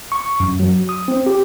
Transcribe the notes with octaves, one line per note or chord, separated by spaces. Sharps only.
C#6
F#2
F#3
D#6
C4
G4